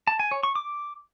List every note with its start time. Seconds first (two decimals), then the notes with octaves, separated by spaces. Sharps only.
0.07 A5
0.19 G#5
0.31 C#5
0.43 C#6
0.55 D6